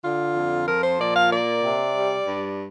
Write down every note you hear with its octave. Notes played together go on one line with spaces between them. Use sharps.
D3 F4
F2
F3 A#4
C5
A#2 D5
F5
A#3 D5
C3
G3
G2